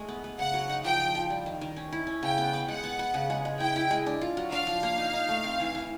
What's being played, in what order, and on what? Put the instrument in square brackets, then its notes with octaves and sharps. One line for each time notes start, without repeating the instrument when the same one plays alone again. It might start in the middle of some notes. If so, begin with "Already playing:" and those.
Already playing: [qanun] G#3 A3
B3
B3
[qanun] C#3 [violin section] F#5
[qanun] F#3
D#4
[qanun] F3 [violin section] G5
[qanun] F3
F3
G3
D#3
D#3
C#4
E4
C#4
[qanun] C#3 [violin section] G5
[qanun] B3
B3
[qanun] G#3 [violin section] F#5
[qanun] B3
B3
C#3
G#3
G#3
[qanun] E4 [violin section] G5
[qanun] E4
G#3
D4
F4
F#3
[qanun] D4 [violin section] F5
[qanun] F3
A#3
D#4
D#4
A3
C4
E3
E3